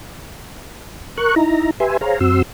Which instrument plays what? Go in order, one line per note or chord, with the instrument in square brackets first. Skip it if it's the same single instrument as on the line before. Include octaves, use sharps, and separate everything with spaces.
[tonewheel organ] A#4 C#6 F#6
D#4 E4 A#5
G4 B4 E5 G#5 C6
G#4 C5 C#5 F5 A#5
F#2 C4 F#4 C6 E6